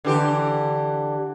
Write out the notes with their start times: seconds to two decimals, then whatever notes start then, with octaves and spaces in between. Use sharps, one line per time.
0.05 D3 E3 G4